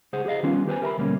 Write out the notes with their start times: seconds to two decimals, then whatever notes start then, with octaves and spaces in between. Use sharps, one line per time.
0.13 C#2 G#4 C5 F#5
0.25 G4 G#4 C5 D#5 F5
0.43 D#3 G3 B3 C#4 F4
0.67 G4 B4 C5 G#5
0.82 A#4 E5 A#5 B5
0.97 D2 B2 G3 A#3 C4 C#4